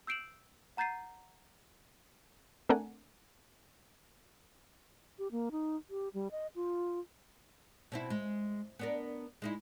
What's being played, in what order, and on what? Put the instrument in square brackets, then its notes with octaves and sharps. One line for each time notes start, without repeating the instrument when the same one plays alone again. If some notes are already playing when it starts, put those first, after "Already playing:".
[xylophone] E6 G6 C7 D7 E7 F#7
F#5 A#5 G6 A6 C7 D#7
[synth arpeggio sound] A3 C4 D4 A#4 F#5 G#5
[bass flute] G4
A#3
D#4
G4
G3
D#5
F4
[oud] B2 C4 E4
G#3
B3 D4 A#4
G#3 D#4 E4